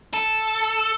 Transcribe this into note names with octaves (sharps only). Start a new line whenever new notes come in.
A4